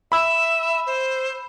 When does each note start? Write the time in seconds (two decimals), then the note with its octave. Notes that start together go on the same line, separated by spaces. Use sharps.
0.12 E5 B5 E6
0.86 C5